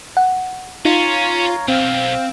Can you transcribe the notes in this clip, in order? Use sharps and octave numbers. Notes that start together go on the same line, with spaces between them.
F#5
C#4 D#4 F4 C#5 F5 A#5
B1 C4 F5